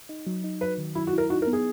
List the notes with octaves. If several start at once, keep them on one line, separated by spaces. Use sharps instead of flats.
D#4
F#3
D#4
F#3 B4
D#3
F#3 E4
F#4
E4 A#4
D#4 F#4
A#4
B3
G#4